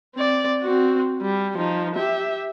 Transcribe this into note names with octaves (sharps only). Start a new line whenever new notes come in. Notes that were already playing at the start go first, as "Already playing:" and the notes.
C4 D5
C4 F#4
G3
F3 D#4
G4 E5